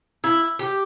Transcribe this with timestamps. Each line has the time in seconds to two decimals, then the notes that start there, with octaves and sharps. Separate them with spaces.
0.24 E4
0.59 G4